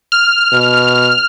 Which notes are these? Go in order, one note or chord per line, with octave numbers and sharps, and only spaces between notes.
F6
B2